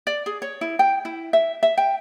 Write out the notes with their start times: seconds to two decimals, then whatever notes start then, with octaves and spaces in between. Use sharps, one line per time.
0.07 D5
0.26 G#4
0.42 C#5
0.61 E4
0.79 G5
1.05 E4
1.33 E5
1.63 E5
1.78 G5